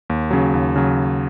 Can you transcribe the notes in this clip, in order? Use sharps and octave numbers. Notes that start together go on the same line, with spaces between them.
D#2
C#3 F#3
D#2
C#3 F#3